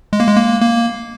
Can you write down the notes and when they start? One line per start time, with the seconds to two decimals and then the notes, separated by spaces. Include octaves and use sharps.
0.13 G#3
0.20 A#3
0.27 G#3
0.37 A#3
0.61 A#3